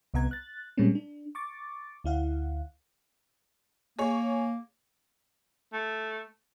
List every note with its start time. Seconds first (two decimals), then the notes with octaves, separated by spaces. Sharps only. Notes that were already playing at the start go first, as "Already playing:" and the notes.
0.14 C2 C3 B3 F#5 A#5 G#6
0.31 F#6 A6
0.77 A#2 G3 G#3 A#3 C4 C#4
0.95 D4
1.35 C#6 D6 A6
2.04 D2 E4 F5 F#5
3.99 A#3 G#4 C#5
5.73 A3